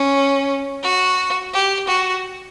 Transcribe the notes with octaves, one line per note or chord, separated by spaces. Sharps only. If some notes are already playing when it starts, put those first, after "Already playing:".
Already playing: C#4
F#4
G4
F#4